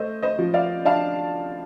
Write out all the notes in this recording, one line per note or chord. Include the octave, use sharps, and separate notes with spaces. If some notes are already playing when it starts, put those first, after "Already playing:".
Already playing: A3 C5 D#5
C5 D#5
F3
D5 F5
D4 F5 A5